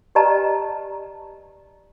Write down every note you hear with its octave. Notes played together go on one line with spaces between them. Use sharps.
G4 B4 D5 D#5 A5 A#5